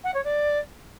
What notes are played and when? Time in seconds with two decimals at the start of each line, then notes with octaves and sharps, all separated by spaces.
0.04 F#5
0.14 C#5
0.24 D5